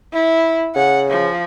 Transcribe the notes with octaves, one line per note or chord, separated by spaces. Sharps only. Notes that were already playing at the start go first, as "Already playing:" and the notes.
E4
C#3 F#5
F3